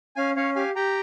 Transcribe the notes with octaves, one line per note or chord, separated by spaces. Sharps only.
C#4 F5 G#5
C#4 C#5 F5
G4 F5 G#5
G4 G5 A#5